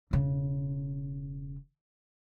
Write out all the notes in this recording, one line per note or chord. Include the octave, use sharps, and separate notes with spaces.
E1 C#3